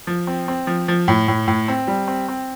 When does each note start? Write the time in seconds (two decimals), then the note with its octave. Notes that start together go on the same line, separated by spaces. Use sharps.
0.07 F3
0.27 C4
0.48 C4
0.67 F3
0.88 F3
1.08 A2
1.28 A2
1.48 A2
1.68 C4
1.88 G3
2.08 C4
2.28 C4